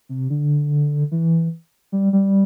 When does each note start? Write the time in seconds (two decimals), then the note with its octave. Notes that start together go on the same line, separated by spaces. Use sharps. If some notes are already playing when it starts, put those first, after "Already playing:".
0.09 C3
0.30 D3
1.11 E3
1.92 G3
2.13 G3